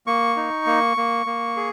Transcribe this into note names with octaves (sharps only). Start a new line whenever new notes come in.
A#3 C#6
D#4
A#3
A#3
A#3
G#4